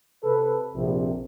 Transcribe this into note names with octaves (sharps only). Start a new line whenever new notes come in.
C3 A4 B4
A#1 F2 C3